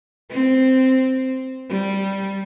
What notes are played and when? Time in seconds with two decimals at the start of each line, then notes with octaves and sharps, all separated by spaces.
0.30 C4
1.70 G3